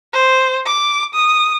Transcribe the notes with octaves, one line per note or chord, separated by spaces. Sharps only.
C5
D6
D#6